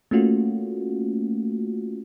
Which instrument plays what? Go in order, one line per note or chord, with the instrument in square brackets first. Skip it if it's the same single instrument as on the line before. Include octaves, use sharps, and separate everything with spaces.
[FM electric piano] A3 A#3 C#4 F4 F#4